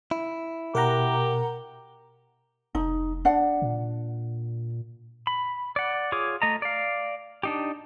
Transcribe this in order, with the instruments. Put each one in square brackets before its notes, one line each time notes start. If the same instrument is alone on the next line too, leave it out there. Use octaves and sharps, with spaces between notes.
[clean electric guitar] E4
[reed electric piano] B2 [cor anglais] G4 [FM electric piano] A#4 F#5 A#5
[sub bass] F1 [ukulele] D#4
[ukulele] D4 F#5
[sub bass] A#2
[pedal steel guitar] B5
D5 F#5
F4 G#4 C#5 D6
A3 D#5 A#5
D5 F5
D4 D#4 G4